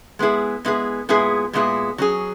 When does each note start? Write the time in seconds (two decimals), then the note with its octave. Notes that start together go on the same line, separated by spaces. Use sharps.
0.19 G#3 B3 E4 G#4
0.65 G#3 B3 E4 G#4
1.09 A#2 G#3 B3 E4 G#4
1.53 A#2 G#3 B3 E4 G#4
1.98 F#3 C#4 G#4